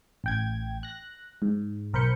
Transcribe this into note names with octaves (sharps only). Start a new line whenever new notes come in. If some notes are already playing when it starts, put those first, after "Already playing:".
A1 G5 G#6
F#6 A#6
G#2
B1 A#4 C5 B5 G6 C#7